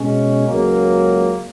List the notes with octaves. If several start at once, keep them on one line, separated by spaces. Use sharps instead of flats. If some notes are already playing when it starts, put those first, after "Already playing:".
Already playing: B2 G#3 C#4
C#2 C#3 F#3 A#3